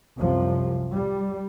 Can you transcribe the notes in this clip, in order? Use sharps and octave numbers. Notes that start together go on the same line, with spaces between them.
C2 F#2 C3 F3
G3